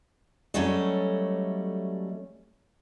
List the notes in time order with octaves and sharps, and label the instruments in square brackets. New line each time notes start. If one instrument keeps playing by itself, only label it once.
[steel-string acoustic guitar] F#3 G3 A3 C#4 A4 D#5